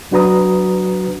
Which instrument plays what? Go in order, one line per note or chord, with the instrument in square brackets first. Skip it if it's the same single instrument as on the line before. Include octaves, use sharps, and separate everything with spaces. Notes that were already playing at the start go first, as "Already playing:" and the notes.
[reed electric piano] F#3 D4 F#4 B4 A#5 D#6